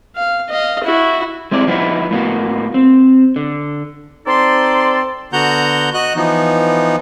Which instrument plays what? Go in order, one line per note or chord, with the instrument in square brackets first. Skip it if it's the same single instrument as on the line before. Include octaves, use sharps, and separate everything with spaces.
[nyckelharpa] F5
D#5 F5
E4 F#4
[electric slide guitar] G#3 C4 E4 D5
F3 G#3 B3 C4 D#4 E4
A2 A#3 B3 F#4
C4
D3
[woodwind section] C4 D#4 A4 D5 C6
[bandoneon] D3 B3 F#4 F#5 A#5 G6
F#4 D#5 F#6
E3 F3 B3 D#4